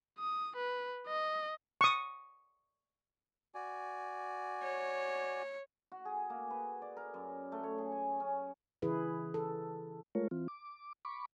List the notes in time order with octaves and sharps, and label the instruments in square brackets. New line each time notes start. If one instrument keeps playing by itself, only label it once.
[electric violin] D#6
B4
D#5
[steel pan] C#6 D#6
[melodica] F#4 D5 G#5
[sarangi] C#5
[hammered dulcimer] F#4
G#4
A#3
B4
D5
A#4
F#2
A3
C#5
G#4
G#5
C#4
[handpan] C#3 E3 E4 G#4 B4
A4
[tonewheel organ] G#3 A3 F4 A#4 C#5
E3 C4 F4
D6
B5 C#6 D6